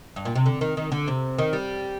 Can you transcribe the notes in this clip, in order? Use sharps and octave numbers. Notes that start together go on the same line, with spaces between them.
G2
A#2
C3
D3
D#3
D#3
D3
C3
D#3
G3